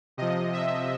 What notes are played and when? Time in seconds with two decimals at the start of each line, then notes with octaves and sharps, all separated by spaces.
0.18 C3 F3 D#5
0.53 E5